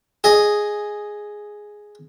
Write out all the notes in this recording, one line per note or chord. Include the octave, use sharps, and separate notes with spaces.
G#4 D#5